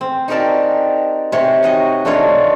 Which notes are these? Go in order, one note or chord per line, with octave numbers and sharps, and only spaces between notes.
C4
D#4 F#4 G4 A#4 D5 A5
C3 C#5
D#4 F#4 D#5
A3 D4 D#4 F4 C#5